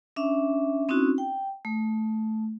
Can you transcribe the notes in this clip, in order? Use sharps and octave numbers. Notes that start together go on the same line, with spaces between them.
C#4 D4 E5
C4 C#4 D#4 E4 F#4
G5
A3